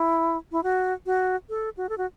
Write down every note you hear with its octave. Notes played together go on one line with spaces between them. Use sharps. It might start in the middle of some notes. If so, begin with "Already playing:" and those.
Already playing: E4
E4
F#4
F#4
A4
F#4
A4
F#4